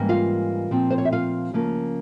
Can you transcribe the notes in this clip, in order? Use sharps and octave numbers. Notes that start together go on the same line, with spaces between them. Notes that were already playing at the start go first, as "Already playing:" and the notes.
Already playing: G#2 E3 G3 A#3 C#4
F4 F5
A#2 F3 C4
C5
C#5
E5
F4 F5
C#3 F3 A#3 C#4